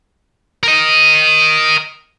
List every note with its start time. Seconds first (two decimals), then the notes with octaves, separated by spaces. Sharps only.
0.63 A#4 D#5